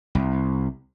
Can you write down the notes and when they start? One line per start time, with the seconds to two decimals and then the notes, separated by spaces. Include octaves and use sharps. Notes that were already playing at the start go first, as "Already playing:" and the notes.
0.15 C2